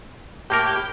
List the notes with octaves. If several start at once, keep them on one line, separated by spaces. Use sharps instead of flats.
A2 A#3 G4 A#4